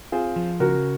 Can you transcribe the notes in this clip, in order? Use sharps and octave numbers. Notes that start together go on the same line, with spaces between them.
C4 F4 G#4
F3
C#3 F#4 A#4